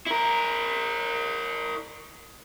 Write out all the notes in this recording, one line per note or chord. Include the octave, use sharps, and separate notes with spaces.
E4 A#4